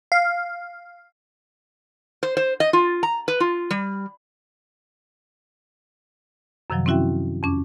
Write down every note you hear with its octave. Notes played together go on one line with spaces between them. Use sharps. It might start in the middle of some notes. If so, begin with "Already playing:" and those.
F5
C5
C5
D#5
F4
A#5
B4
F4
G3
F#2 C3 D#3 F3 F#3
C4 C#4 E4 F#4 E5 G5
F2 C#4 D6